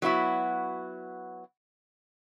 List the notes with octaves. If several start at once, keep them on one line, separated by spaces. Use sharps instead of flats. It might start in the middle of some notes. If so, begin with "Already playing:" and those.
F#3 B3 E4 F#4